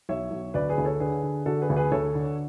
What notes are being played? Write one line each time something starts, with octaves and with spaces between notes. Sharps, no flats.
B1 C#5 E5
B1
D2 B4 D5
G#4 B4
D2
A4 C#5
D3 G#4 B4
D3
D3 F#4 A4
G#4 B4
D2
G#4 B4
D2 A4 C#5
D3